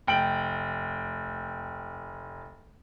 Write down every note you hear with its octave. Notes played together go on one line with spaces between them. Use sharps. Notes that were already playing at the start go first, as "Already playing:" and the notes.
F1 G5 D7 F#7